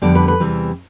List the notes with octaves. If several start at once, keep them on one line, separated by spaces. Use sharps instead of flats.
F2 D3 G3 B3 D5
B4
B4
E2 C3 E3 G3